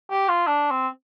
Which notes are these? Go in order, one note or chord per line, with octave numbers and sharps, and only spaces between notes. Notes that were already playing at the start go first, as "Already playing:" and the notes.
G4
F4
D4
C4